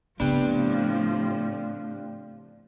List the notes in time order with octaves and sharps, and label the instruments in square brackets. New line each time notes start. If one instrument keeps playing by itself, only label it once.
[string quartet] A2 F3 [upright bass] C#3 C4 [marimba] B3 [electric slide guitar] D4 G4